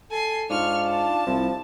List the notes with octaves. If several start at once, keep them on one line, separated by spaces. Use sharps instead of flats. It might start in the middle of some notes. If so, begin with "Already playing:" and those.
A4 G#5 C7
G#2 D4 F4 C#6 F6
A5
C2 F3 E4